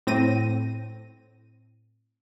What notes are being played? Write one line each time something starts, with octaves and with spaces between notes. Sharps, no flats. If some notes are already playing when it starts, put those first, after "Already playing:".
A2 C4 A#6 D#7